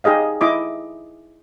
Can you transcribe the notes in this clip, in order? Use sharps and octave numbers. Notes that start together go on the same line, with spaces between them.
D#4 G4 G#4 D#5 F5
E4 D#5 D6